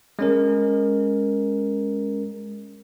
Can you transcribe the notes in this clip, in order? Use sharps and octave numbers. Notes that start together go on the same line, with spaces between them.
G#3 C#4 A#4